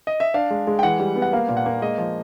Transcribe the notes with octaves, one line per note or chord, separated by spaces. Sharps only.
D#5
E5
D4 F5
G#3
G#3
G5
E3 F#5
G3
B3
F#5
A#3 F5
A#2
F#5
A#3
G#3 D#5
F3